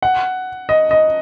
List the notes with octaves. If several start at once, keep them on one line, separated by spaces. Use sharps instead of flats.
F#5
D#5
D#5